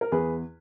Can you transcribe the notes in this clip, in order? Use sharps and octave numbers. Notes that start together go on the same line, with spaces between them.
A#4
E2 G#4 B4